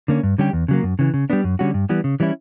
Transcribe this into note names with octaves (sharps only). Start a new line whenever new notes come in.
D3 A#3 C#4
G2
D3 G3 C#4 G4
E2
C#3 F#3 A#3
F#2
C#3 E3
C#3
G3 B3 D4
F#2
D3 G3 C#4 F#4
G2
E3 G3 B3
C#3
E3 G3 C#4 E4